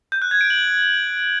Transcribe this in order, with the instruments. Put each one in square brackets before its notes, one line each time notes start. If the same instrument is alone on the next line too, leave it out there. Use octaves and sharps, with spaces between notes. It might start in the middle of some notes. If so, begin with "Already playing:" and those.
[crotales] G6
F#6
G#6
D7
F#7